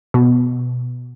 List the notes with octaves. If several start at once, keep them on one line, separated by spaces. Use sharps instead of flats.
B2